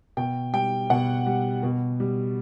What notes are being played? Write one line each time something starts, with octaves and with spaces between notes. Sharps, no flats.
B2 G5
G3 G5
B2 F#5
G3
B2
G3